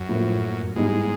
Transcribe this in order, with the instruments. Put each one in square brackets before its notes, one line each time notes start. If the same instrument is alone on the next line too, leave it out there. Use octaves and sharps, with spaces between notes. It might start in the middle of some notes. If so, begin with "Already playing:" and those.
Already playing: [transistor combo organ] F#2
[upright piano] A2 F3 A#3
[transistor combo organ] G#2 [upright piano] E3 G3 B3 D#4